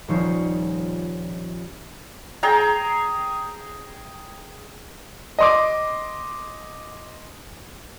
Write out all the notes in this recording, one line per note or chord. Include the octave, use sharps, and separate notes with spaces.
D#1 D#3 F3 D#4 C#5 C7
G#4 G5 A#5
D#5 C6 D6